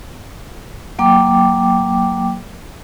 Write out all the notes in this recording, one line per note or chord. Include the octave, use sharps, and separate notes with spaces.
F#3 A#3 G5 D6